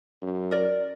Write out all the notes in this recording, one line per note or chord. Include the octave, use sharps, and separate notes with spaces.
F#2
A#4 D5